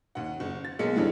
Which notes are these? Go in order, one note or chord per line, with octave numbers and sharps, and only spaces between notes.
D#2 F#5
F#1
A6
B1 G#3 A#3 C#7
B1 F2 D3 E3 G3